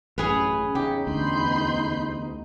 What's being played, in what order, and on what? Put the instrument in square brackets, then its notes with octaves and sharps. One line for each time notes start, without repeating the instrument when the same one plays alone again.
[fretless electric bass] A1 F#2 [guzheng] C#4 G#4 B4
[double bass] E2 D#4 [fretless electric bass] C#3 [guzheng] G4
[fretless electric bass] D2 [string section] B5 C6 G6